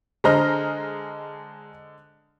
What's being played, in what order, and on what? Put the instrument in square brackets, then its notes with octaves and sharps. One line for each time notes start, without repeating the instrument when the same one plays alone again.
[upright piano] D3 C5 D#5 [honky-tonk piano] G#3 A#5 F6